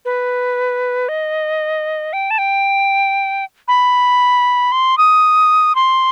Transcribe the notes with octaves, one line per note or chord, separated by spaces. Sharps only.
B4
D#5
G5
A5
G5
B5
C6
D#6
C6